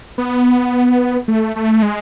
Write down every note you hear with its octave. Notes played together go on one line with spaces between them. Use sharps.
B3
A3
A3
G#3